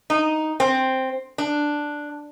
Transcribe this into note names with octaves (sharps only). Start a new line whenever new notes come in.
D#4
C4
D4